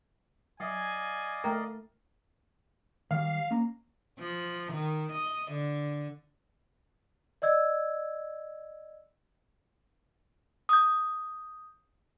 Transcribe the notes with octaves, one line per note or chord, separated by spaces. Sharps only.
F#3 D5 D#5 F5 G#5
A3 A#4 G5
D#3 F#3 G3 F5
A#3 C#4 A#5
F3
D#3
D#5
D3
D5 D#5 E6 G#6
D#6 G6